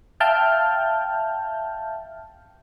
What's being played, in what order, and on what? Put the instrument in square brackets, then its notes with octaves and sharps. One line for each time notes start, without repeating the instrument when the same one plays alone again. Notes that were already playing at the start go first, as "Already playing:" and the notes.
[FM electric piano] E5 F5 G5 A5 F6 G6